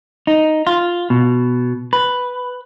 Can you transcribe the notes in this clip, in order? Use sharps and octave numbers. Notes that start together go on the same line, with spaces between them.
D#4
F4
B2
B4